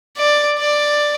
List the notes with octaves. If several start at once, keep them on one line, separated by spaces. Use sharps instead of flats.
D5
D5